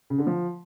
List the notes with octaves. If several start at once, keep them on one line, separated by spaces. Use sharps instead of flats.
C#3
D3
F3